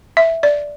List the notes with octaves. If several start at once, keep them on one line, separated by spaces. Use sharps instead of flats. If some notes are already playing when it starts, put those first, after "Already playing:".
E5
D5